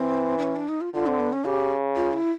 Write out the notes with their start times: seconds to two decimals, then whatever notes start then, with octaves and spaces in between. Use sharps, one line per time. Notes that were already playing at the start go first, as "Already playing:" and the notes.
Already playing: E3 C4
0.38 D4
0.43 C#4
0.56 D4
0.69 D#4
0.81 F4
0.94 D3 F4
1.07 C4
1.20 B3
1.32 C#4
1.45 C#3 G4
1.96 F4
2.13 E4